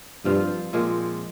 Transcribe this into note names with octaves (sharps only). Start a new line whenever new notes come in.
G2 F3 C4 F4
A#2 F3 G#3 C4